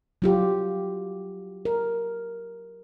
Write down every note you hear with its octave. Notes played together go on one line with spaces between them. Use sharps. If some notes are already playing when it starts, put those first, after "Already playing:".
F#3 F4 G4
A#4